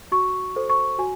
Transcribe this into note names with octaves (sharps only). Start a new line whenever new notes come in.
F#4 C#6
A4 C5
C#6
F#4 G#5